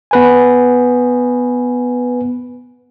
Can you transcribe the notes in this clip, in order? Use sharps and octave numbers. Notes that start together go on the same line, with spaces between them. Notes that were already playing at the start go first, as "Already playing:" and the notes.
B3 B4 G#5